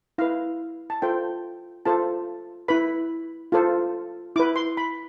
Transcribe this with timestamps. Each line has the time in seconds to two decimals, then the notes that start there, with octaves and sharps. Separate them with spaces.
0.18 E4 B4 F5
0.90 A5
1.02 F4 A4 C5 G5
1.86 F4 A4 C5 A5
2.68 E4 B4 B5
3.52 F4 A4 C5
4.36 E4 D6
4.40 B4
4.56 C6
4.77 B5